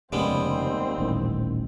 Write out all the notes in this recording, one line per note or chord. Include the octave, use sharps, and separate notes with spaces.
F1 D#2 G#2 C#3 G3 G#3 B3 C4
D#1 A1 D#3